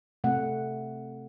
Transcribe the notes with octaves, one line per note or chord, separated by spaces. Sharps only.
C3 A3 F#5